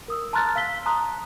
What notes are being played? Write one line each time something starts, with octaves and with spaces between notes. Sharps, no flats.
A#4 D#6 E6
A5 A#5 C6 F6 F#6 A6
F5 E6 B6 G7
A5 A#5 C6 D#6 F#6